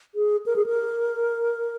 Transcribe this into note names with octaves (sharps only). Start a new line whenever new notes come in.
G#4
A#4
G#4
A#4